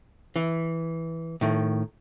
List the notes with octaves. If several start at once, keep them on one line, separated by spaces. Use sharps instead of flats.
E3
A2 D#3